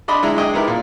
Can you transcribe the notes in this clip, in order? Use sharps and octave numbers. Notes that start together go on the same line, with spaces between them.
D4 D5 D#5 B5 C6
D3 G#3 E4 A#5
D3 G#3 D#5 G5
G#3 B3 D#4 E4 G4 A#4
A#2